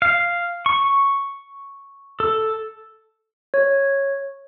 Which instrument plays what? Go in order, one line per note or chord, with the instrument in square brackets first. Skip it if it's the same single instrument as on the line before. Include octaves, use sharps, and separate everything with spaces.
[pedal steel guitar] F5
C#6
A4
[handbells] C#5